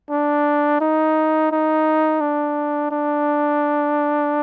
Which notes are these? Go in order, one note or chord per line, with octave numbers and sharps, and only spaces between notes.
D4
D#4
D#4
D4
D4